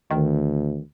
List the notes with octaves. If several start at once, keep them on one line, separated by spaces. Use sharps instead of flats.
D2 D#3